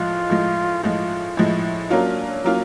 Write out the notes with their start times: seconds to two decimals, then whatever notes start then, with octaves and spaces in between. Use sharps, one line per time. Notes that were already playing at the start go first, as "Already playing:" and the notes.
Already playing: A2 F3 G#3 F4
0.29 A2 F3 G#3
0.83 A2 F3 G#3 F4
1.37 A2 F3 G#3 E4
1.90 F#3 A#3 C#4 D4 F4
2.44 F#3 A#3 C#4 F4